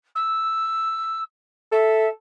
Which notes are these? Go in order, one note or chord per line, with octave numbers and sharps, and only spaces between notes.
E6
A4 E5